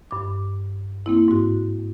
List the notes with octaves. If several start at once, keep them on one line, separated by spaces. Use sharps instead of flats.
G2 D6
A#3 C4 E4
G#2 F#4